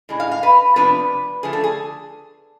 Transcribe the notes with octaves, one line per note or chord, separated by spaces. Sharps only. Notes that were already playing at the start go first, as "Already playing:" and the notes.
A2 G#3 D4
F5
F5
B4
C3 F3 B3 D4 B4
D3 F3 A3 G#4
A4
G#4